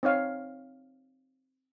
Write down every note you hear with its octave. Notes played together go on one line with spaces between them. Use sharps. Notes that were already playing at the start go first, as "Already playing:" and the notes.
C4 D#4 C#5 F5